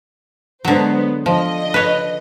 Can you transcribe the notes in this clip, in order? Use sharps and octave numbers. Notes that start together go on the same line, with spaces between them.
D3 F#3 G#3 B3 C5
D3 F3 D#5
B4 C#5